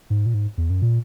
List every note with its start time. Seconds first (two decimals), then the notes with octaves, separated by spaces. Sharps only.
0.10 G#2
0.26 A#2
0.34 G#2
0.58 E2
0.70 F#2
0.82 A#2